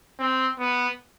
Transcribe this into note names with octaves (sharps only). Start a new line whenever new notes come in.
C4
B3